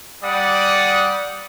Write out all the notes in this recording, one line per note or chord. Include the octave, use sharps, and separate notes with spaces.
G3 D5 F#5 D#6